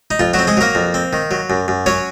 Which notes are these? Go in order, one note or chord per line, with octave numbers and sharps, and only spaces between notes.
D#4
F2 F4
F#3 F#4
C4
G#3 G#4
F#3 A#3 A#4
F2
C4
D#3
F#3
F#2
F#2
F#3 C#4 C#5